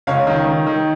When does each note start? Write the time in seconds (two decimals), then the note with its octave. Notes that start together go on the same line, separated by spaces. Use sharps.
0.07 C#2 C#5 F5
0.27 D#3
0.46 D#3
0.66 D#3